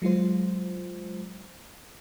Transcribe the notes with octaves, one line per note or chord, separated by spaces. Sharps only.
F#3 G#3 F4 C5